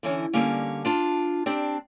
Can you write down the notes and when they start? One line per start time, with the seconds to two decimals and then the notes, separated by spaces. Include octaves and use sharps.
0.03 D3 E3 C#4
0.33 D3 G3 A#3 C#4
0.85 D4 F4 A5
1.46 C4 D4 G4 D5